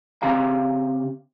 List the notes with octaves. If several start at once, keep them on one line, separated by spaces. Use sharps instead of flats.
C#3 C4 G4 F5 A#5